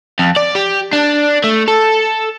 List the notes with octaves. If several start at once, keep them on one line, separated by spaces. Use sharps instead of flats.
F2
D5
G4
D4
A3
A4